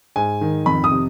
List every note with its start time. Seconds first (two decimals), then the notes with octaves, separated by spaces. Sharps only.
0.16 G#2 G#5
0.41 D#3
0.66 F2 B5
0.84 D#6
0.91 C3